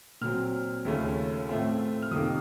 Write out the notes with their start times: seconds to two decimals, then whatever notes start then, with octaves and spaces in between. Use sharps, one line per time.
0.21 A#2 F#3 C4 F6
0.85 D#2 C#3 A3 C#4 F4
1.48 A2 A3 C4 F4
2.02 F6
2.11 F2 C3 D#3 A#3 D#6